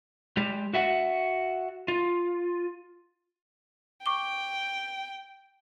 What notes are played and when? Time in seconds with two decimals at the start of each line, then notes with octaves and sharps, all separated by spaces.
0.37 G#3 G4
0.74 F#4 E5 F#5
1.88 F4
4.06 G5 C#6 D6 G7